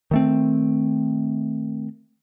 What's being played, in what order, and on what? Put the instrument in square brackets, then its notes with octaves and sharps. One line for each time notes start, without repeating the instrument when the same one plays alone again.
[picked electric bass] D#3 A3 C4